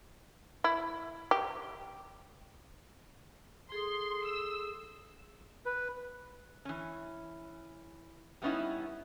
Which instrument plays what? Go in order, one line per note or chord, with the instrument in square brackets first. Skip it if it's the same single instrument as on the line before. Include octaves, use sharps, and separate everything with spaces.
[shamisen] E4
G4
[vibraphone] G#4 A4 D#6 [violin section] C6
[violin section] E6
[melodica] B4
[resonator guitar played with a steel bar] E3 C#4
G3 A3 B3 C#4 D#4 E4